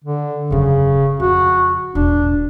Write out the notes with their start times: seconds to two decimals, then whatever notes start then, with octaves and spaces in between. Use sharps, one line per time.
0.04 D3
0.50 E1 F#2 C#3
1.20 F2 C#3 F#4
1.95 E1 A1 D4